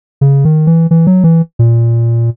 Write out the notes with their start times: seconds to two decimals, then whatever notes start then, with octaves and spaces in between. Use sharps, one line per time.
0.21 C#3
0.45 D#3
0.67 E3
0.91 E3
1.07 F#3
1.24 E3
1.59 A#2